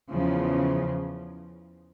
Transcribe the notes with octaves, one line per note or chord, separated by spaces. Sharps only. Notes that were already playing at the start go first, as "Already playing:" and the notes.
E2 C#3 F3